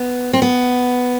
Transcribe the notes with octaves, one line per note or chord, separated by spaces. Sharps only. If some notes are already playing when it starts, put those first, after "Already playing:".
Already playing: B3
C4
B3